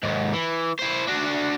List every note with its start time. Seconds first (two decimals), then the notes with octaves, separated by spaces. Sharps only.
0.03 D#2 G#2
0.33 E3
0.79 E4 C5
1.08 D4 F#4